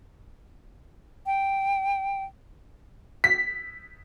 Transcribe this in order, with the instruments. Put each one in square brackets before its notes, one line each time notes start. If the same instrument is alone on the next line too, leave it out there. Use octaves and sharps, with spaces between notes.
[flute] G5
[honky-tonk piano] B6